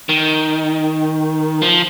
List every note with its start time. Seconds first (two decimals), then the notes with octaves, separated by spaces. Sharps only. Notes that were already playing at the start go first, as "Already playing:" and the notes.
0.09 D#3
1.62 F3